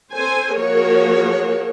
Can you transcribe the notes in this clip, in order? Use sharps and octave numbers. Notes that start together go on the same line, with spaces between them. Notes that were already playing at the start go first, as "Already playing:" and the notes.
C4 A4 C5 G#5
F3 A#3 F#4 G#4 A#4 C#5